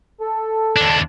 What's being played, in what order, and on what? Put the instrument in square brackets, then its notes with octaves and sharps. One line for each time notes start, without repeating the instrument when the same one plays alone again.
[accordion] A4
[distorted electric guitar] D#2 D4